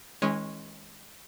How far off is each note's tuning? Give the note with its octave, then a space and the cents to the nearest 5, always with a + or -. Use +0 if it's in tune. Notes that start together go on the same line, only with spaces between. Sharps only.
D#3 +45 G#3 +0 C#4 -15